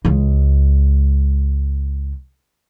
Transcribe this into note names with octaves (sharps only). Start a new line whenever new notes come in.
C#2 G#3